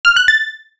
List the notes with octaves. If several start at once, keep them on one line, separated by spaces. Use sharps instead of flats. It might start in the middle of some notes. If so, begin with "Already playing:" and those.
F6
F#6
A6